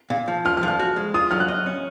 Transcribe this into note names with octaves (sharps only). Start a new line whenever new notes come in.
A#2
F3
F4 F6
F6
F3
F6
F#4
G#3
F4 D#6
F#3 F6
F#6
D#5
C#4